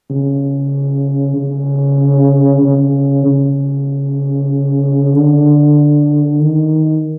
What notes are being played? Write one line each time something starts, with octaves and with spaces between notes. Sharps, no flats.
C#3
C#3
C#3
C#3
D3
D#3